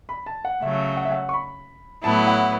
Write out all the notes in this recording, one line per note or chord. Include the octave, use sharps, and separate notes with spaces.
B5
A5
F#5
C#3 F#3 A3 E5
F#5
E5
F#5
C#6
B5
A2 F#3 B3 E4 A5
F#5